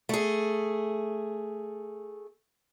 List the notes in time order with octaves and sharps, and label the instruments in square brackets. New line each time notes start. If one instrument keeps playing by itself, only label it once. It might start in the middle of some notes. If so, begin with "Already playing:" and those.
[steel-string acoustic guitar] A3 G#4